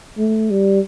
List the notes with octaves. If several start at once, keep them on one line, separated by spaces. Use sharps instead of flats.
A3
G3